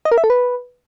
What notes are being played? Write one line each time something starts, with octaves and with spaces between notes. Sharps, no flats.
D#5
A#4
E5
A4
B4